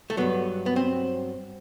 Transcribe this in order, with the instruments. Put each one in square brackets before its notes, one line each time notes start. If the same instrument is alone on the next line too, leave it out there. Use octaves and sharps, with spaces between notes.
[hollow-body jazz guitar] A3
G2 F#3 B3
B3
C4